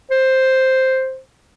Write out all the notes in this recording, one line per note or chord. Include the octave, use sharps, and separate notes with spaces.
C5